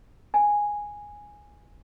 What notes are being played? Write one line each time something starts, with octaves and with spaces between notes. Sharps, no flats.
G#5